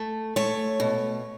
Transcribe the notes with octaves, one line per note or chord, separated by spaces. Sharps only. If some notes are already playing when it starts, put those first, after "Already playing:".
Already playing: A3
A3 C#5
B2